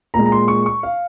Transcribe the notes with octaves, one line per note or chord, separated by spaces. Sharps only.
A#2 G#3 A#5
A#5
C6
C#6
C#6
F5